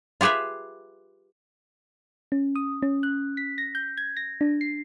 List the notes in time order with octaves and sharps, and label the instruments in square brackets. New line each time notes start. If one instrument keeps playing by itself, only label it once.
[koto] F4 G4 G#4 B4 E5
[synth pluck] C#4
D#6
C#4
F#6
B6
A#6
G6
G#6
A#6
D4
C7